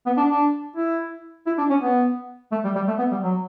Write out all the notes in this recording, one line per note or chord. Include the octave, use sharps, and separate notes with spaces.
B3
D4
D4
E4
E4
D4
C#4
B3
A3
G3
G3
A3
B3
G3
F#3